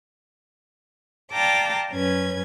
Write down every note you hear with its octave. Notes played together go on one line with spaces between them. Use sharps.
D5 F5 G5 A5 A#5 D6
F#2 C#4 B4 G#6